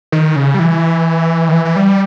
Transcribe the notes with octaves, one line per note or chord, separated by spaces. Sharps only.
D#3
C#3
G3
E3
D#3
E3
E3
G3